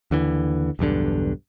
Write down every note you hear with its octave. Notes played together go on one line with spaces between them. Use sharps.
D#2 D3 E3
B1 E2 G2 D3